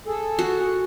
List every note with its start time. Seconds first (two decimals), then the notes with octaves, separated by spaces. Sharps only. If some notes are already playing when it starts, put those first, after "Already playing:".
0.06 G#4 A4
0.39 F#4